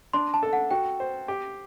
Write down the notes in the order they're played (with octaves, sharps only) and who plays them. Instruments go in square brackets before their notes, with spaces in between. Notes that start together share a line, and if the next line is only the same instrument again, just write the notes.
[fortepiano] D4 [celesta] C6
[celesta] A5
[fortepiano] A4
[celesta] F#5
[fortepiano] F#4 [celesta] G5
[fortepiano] C5
G4